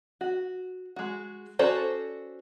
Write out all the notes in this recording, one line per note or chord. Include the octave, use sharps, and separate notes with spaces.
F#4
G#3 F#4
C#4 F#4 A4 C5 D5